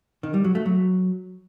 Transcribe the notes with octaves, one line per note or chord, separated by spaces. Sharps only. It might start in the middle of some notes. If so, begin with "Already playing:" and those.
D#3
G3
F#3
A3
F#3